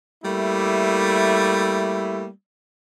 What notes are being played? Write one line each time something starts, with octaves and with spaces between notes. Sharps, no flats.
G3 A3 A#3 E4